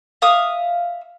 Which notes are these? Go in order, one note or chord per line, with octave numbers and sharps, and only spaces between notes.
E5 F5 D#6